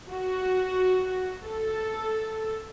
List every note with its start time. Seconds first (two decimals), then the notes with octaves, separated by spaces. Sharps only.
0.11 F#4
1.45 A4